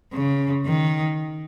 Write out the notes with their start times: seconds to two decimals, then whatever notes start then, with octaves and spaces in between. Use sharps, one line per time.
0.13 C#3
0.66 D#3